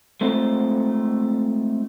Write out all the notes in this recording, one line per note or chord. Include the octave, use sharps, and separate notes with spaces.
G#3 A3 C4 D#4 F4